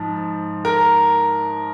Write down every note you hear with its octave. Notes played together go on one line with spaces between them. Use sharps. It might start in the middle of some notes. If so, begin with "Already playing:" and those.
Already playing: G#2 F3
A#4